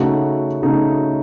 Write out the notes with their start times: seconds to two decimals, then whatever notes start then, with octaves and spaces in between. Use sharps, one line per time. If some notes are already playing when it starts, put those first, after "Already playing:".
Already playing: C#3 A3 D#4 F#4
0.62 C#3 A3 D#4 F#4